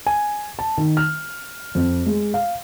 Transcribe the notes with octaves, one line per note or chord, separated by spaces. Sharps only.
G#5
A5
D#3
F6
F2
G#3
F5